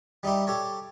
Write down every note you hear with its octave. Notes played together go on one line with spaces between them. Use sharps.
G3 D#4 E4 G4
G4 A4 C#5